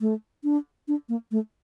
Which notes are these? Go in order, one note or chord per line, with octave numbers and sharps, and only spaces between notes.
A3
D4
D4
A#3
A3